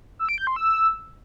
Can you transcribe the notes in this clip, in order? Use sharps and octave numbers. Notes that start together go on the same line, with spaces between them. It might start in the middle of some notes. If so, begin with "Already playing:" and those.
E6
D7
G6
C6
E6